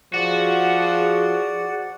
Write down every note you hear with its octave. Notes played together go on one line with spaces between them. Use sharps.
F3 F#4 G#4 D5 F#5